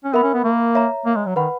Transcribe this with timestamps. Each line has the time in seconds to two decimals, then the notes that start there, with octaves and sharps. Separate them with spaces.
0.04 C#4
0.14 B3 A#4 E5 B5
0.23 C#4
0.34 B3
0.44 A#3
0.75 C#5 E5 A#5
1.05 A#3
1.16 G#3
1.26 F#3
1.36 D#3 B4 F#5 B5